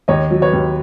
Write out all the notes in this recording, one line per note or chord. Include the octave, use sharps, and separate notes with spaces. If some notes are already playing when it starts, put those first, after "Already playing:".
D#2 C#5 D#5
F#3
B4 C#5
D#2